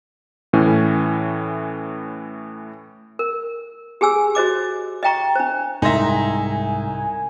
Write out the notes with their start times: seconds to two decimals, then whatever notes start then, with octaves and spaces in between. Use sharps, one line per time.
0.53 A2 E3 C#4
3.19 A#4
4.01 G4 G#4 G#5 E6
4.35 F#4 C5 D#5 D6
5.03 D#5 E5 G5 A#5 C#6
5.35 D4 C5
5.82 C2 G#2 D#4 E5 G#5 C6 A#6